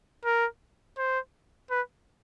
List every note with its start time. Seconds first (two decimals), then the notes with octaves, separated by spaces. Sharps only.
0.25 A#4
0.98 C5
1.70 B4